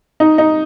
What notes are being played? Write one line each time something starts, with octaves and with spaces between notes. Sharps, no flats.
D#4
D#4